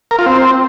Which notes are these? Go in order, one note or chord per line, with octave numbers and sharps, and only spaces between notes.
A#4
F4
C4